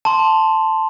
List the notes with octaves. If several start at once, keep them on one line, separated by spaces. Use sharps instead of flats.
A5 C6